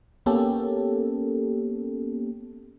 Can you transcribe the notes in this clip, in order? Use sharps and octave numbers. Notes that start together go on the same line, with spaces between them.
A#3 B3 C#4 G4 A4